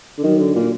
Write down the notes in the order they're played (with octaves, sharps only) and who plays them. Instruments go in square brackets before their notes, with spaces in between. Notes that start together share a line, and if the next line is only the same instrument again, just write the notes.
[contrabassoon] D3
[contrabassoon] D#3 [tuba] F#3
[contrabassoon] D3
A#2